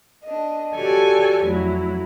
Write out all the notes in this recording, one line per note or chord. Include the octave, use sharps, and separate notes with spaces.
D4 D#5
F#4 G4 A4 C#5 D5 G#5
F2 F#3 A3 E4